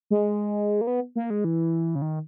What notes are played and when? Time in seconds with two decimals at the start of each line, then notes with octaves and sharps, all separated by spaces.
0.11 G#3
0.81 A#3
0.87 B3
1.16 A#3
1.30 G#3
1.44 E3
1.95 C#3
2.02 D#3